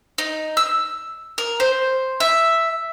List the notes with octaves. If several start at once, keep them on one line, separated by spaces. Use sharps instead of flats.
D#4
E6
A#4
C5
E5